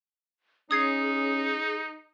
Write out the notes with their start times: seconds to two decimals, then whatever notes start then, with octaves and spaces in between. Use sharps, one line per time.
0.71 C#4 D#4 G#4 D#6 G#6 C7